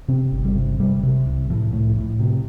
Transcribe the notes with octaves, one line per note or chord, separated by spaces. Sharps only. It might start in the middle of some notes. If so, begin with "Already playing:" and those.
C3 C4
G1
G3
C3
C3 G3
C3
C2
A2 F3
A2
A2
C3